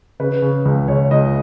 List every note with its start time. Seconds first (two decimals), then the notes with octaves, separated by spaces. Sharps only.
0.20 C#3 B4
0.42 C#3
0.65 C#2
0.88 C#2 C#5
1.11 C#2 D#5